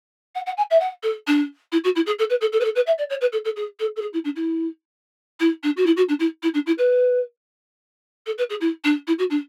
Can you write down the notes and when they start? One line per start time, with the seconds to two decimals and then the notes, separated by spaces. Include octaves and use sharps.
0.35 F#5
0.46 F#5
0.57 G#5
0.71 E5
0.80 F#5
1.03 A4
1.27 D4
1.72 E4
1.84 F#4
1.96 E4
2.06 G#4
2.19 A4
2.30 B4
2.41 A4
2.53 A4
2.60 B4
2.65 A4
2.75 B4
2.87 E5
2.98 D5
3.10 C#5
3.21 B4
3.33 A4
3.45 A4
3.56 G#4
3.80 A4
3.96 A4
4.02 G#4
4.13 E4
4.25 D4
4.36 E4
5.40 E4
5.63 D4
5.77 F#4
5.86 E4
5.97 F#4
6.09 D4
6.20 E4
6.43 E4
6.54 D4
6.66 E4
6.78 B4
8.26 A4
8.38 B4
8.50 G#4
8.61 E4
8.84 D4
9.07 E4
9.19 F#4
9.30 D4